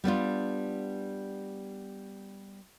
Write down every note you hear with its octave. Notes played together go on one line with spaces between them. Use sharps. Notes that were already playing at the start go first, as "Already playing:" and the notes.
G3 B3 D4 F4